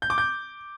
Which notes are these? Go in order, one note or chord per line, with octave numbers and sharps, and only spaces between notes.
G6
D6
G6